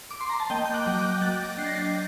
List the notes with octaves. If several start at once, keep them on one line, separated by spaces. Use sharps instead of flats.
D6
C6
A#5
A5
A#3 D#5 G5
G6
D6 F#6
F#3
D6 F#6
F#3 F#6 A6
D4 C7
A#6
A6 C7